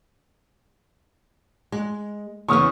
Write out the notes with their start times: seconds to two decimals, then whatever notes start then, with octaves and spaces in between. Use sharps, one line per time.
1.72 G#3
2.48 E2 C#3 E3 C#6 D#6 F6